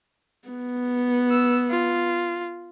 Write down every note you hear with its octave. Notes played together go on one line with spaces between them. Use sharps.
B3
E6
F4